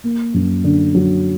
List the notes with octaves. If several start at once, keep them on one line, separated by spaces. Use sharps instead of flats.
A#3
F#2
D3
F#3